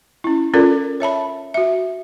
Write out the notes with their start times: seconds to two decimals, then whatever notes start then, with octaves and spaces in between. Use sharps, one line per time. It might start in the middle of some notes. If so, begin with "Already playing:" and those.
0.24 C#4 E4
0.54 C#4 F4 A4 A#4 D5
1.00 C#5 E5 A5 B5
1.54 F#4 E5